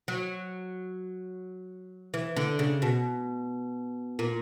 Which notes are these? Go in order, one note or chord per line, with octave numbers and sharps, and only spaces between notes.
F#3
E3
D3
C#3
B2
A#2